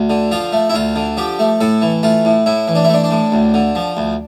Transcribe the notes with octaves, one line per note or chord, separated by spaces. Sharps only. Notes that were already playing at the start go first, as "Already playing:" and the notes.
Already playing: D2
D3
F3 F4
A3
E4
D2 F4
D3
F3 G4
A3
A2 A4
E3
A3 F4
A2
A2 E4
E3
D4
E4
A3 D4
D4
A2
D2
D3
F3
D2